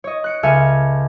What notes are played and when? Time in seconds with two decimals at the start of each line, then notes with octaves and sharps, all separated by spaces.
0.04 C#5 D#5
0.24 F#6 C#7 D7
0.43 C#2 A4 E5 G#5 F6 C#7